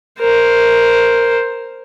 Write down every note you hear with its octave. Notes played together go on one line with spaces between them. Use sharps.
A#4 C5